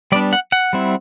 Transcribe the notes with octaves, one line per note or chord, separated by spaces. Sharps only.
G3 B3 D4 D5
F#5
F#5
G3 C4 E4